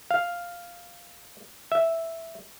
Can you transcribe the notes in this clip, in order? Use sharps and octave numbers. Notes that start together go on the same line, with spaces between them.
F5
E5